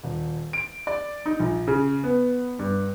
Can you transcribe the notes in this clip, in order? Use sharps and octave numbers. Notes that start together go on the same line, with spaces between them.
D#1
D7
D5
D#4
A#1
C#3
B3
G2